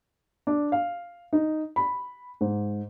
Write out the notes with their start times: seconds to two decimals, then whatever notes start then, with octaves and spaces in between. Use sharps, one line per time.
0.47 D4
0.72 F5
1.33 D#4
1.76 B5
2.41 G#2